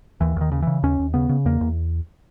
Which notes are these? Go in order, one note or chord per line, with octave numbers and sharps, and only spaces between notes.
D#2 E3
D#2 D#3
C#3
C#3 E3
D#2 C#4
D#2
C#3 B3
C#3
E2 A#3
E2